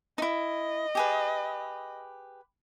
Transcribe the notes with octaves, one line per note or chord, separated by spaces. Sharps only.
D#4 E4 D#5
G4 G#4 B4